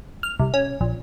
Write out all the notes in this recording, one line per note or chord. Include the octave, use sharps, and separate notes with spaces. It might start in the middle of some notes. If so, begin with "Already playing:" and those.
F6
C2
C#4
A#1